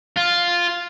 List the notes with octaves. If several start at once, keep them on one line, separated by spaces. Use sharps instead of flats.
F4